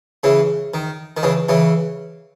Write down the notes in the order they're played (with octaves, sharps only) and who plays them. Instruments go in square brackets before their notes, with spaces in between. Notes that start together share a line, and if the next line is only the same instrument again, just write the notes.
[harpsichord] C#3 E3
D#3
D#3
C#3 E3
C#3 E3